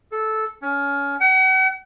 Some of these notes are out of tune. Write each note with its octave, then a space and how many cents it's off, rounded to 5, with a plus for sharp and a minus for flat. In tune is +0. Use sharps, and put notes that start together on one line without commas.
A4 -10
C#4 +25
F#5 +40